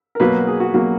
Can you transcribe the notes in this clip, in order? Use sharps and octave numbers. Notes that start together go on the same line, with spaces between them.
A#4
B2 F#3 A#3 B4
G#4
F#4
B2 F#3 A#3